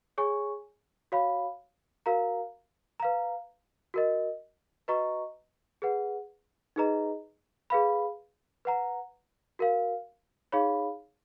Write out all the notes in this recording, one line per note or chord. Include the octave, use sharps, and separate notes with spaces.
G#4 C#5 G#5 C#6
F#4 C#5 F5 B5
F#4 A#4 F5 A#5
B4 F5 A#5
F#4 A#4 D#5
F#4 B4 D#5 A#5 C#6
G#4 B4 F#5
D#4 G#4 B4 D#5 A#5
G#4 B4 F5 B5
B4 F#5 A#5
F#4 A#4 F5
D#4 G#4 C#5 F5 B5